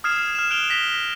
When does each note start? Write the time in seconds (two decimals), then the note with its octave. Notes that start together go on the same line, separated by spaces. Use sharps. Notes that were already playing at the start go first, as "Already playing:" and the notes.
0.04 D#6 F6 G#6 C7 E7
0.35 F6 E7
0.50 F#6 D7 F7 G7
0.70 A#6 B6 G7